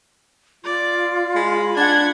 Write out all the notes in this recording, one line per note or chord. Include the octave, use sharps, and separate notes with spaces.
F4 D5
G#3 B5
D4 F#5 G#6